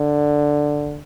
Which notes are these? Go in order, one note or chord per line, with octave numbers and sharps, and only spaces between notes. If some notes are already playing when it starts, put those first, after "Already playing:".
Already playing: D3